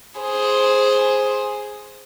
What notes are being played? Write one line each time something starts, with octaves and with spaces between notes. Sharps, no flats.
G#4 C5